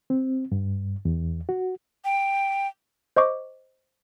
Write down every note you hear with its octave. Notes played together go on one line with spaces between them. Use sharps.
C4
G2
E2
F#4
G5
C5 D#5 C#6 D6